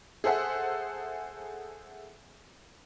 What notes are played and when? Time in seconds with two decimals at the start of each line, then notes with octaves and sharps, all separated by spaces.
0.24 G#4 A4 C5 E5 F#5